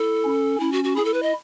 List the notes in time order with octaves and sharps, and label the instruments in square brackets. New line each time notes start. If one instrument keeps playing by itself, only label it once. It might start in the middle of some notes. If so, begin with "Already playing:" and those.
Already playing: [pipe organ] E4 [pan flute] A4
[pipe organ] C#4
[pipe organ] C#4 [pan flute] E4
[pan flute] F#4
F#4
[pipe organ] E4 [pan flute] G#4
[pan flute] A4
B4
D#5